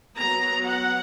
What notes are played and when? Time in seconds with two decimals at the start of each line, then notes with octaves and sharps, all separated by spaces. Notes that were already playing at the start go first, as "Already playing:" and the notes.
0.18 F#3 B3 A#5
0.65 F#5